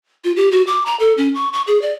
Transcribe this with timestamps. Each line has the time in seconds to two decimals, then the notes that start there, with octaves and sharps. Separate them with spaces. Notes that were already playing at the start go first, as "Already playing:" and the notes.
0.24 F4
0.36 G4
0.52 F#4
0.67 D6
0.86 A#5
1.00 A4
1.18 C#4
1.35 C#6
1.53 C#6
1.67 G#4
1.82 D5